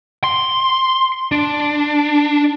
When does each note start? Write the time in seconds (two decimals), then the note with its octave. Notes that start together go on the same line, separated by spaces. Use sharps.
0.24 C6
1.32 D4